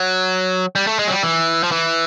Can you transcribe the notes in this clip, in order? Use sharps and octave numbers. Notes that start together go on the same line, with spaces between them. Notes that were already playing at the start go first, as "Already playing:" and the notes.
Already playing: F#3
G3
A3
G#3
F#3
G3
E3
F3
E3